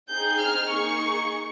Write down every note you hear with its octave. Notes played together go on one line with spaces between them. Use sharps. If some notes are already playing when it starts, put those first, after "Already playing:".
C4 D#4 G#4 G6
F6
A#3 D#4 G#4 C#6